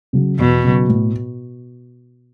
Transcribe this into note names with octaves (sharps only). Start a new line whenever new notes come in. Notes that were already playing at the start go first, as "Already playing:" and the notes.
C#3 F#3
E2 B2
C#3 F#3
A2